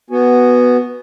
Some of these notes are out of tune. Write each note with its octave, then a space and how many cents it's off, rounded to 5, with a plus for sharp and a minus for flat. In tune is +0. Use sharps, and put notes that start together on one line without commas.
B3 +0 F#4 +5 G#5 +0